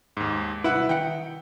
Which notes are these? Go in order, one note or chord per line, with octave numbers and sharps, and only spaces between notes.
D#2 G#2
C2 E4 B4 E5 F#5
D#3 D#4 F#5 G5